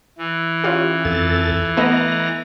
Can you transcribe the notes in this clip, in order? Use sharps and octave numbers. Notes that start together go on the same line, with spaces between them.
E3
C#4 F4 G4
F2 A4 A6
A3 B3 D#5 A#5